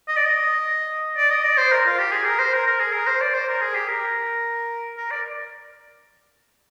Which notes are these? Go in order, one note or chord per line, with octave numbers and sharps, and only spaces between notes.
D#5
D5
D#5
D5
D#5
D5
C5
A#4
F4
G4
G#4
A#4
C5
A#4
A#4
G#4
A#4
C5
D5
C5
A#4
G#4
G4
A#4
A#4
D5